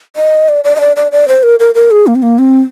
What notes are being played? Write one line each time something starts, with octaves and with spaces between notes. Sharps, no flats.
D#5
D5
D5
D#5
D5
D5
D5
C5
A#4
A#4
A#4
G#4
A#3
C4
A#3
C4